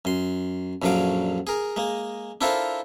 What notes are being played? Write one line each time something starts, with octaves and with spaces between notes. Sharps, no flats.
F#2 C6
A#1 F#2 D3 F#3 F5 D6
G#4 A#4
G#3 A#3
D4 E4 F4 A4 A#4 C5